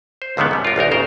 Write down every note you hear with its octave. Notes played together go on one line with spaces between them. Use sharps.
C5
C#2 D3 D#3 A3 B3
F#2 G3
F4 A#4
A1 D2 D#4 A#4
G1 C#3 A#4 C5 G5 A#5